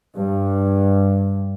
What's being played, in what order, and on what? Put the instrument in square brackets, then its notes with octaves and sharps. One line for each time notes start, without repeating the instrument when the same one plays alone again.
[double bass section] G2